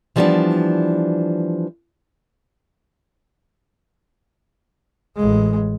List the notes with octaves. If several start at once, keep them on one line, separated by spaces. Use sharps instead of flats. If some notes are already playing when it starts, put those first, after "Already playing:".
E3 F3 G3 A#3 B3 D4
A1 G#3